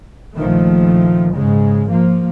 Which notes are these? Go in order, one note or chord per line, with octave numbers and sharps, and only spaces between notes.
A#1 D#3 F3 A3
G#2 C#3 G#3
F3 A#3